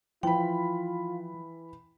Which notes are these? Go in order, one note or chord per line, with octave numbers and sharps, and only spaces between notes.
E3 F3 F4 G5 B5